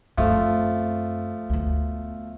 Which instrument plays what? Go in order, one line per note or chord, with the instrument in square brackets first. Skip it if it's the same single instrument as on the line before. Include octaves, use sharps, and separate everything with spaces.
[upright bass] F#2 C4 [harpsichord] F3 A3
[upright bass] D2 B3